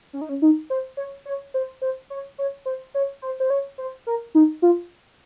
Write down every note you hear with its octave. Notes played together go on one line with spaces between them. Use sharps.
C#4
D#4
C#4
D#4
C5
C#5
C#5
C5
C5
C#5
C#5
C5
C#5
C5
C5
C#5
C5
A#4
D#4
F4